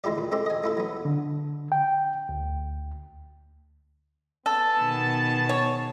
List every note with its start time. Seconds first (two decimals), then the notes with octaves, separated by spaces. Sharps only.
0.04 D2 G#3 E4 G4 D5
0.18 A#2
0.32 G#3 C4 G4 A4
0.46 D#5 G#5
0.64 A3 E4 A4
0.77 F#3 B3
1.05 D3
1.72 G5
2.29 D2
4.46 B3 G#4 A4 A5
4.79 B2 D#3
5.49 C#5